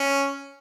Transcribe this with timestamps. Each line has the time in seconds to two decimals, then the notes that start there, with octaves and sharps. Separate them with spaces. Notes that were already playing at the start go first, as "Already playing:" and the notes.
Already playing: C#4